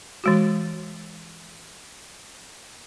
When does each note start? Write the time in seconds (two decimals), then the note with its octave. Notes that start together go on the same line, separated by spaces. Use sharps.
0.24 E3 G#3 F#4